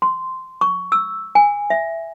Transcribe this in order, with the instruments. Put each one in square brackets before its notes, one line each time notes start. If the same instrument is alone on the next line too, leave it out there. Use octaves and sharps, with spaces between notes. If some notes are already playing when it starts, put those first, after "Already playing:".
[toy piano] C6
C#6
E6
G#5
E5